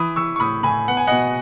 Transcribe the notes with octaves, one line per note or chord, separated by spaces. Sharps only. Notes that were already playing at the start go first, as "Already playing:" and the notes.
Already playing: E3 B5 D#6
E3 C#6 E6
C#6
A2 B5 D#6
A2 G#5 B5
B3 F#5
G#5
B2 D#5 F#5